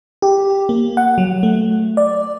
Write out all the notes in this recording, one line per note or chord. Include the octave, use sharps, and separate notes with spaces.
G4
A#3
F#5
F#3
A3
D5